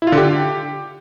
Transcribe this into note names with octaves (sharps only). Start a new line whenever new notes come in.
E4
F4
D3
G4